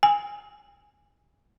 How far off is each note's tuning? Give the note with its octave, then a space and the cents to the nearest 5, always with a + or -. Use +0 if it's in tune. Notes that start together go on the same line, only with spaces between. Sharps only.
G#5 -25